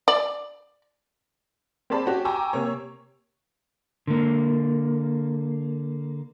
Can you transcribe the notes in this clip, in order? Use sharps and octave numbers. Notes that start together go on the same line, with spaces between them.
D5
C4 G4 G#4 D5 A5 B5
C#4 F#4 G4
G5 G#5 A#5 C#6 D6 E6
C3 A#3 C#5
D3 A#3